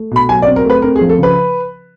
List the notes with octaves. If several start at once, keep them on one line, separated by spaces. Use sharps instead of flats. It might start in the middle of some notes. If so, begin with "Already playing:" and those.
Already playing: A3
B2 B5
F#3 G#5
D5
C4
A#4
A3 B4
C4 A#4
G#4
F3
A4
C#3 B4